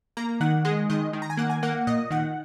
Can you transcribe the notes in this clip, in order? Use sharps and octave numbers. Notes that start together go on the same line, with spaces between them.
A#3 A#5
D#3 F#5
G#3 D#5
D#3 D#5
D#3
A#5
G#5
A#3 F#5
G#5
A#3 F#5
A#2 D#5
D#3 F#5